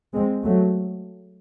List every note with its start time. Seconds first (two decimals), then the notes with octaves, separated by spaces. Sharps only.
0.14 G#3 C4
0.43 F#3 A3